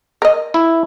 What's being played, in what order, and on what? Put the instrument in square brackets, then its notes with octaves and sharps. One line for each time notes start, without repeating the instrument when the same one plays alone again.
[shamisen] A#4 D#5
[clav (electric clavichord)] E4